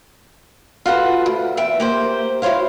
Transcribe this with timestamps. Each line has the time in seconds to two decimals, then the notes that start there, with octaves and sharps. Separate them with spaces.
0.86 F4 F#4 A4 B4
1.26 D2
1.57 E2 E5 G5
1.80 A#3 G4 C5
2.42 E4 F#4 C5 C#5 F5